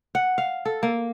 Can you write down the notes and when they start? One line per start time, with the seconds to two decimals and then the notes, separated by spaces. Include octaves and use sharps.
0.15 F#5
0.38 F5
0.65 A4
0.83 A#3